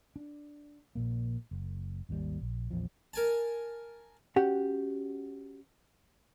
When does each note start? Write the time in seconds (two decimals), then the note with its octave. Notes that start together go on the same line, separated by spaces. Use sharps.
0.16 D4
0.95 A#1 A#2 A#3
1.51 F#1
2.09 G#1 D#2 B2 G3
2.41 A#1
2.71 A#1 E2 F3
3.13 A#4 G#5 A5
4.36 C#4 F#4 G4 F#5